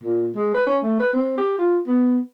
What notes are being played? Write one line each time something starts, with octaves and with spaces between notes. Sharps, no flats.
A#2
G#3
B4
C#4
A3
B4
C4
G4
F4
B3